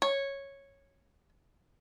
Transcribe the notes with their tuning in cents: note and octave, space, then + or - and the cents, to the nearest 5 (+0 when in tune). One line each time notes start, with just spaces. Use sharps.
C#5 -10